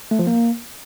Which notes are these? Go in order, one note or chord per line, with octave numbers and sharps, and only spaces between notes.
A3
F3
A#3